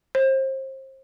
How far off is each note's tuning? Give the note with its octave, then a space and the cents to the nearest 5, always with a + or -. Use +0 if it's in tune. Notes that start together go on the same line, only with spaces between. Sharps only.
C5 +30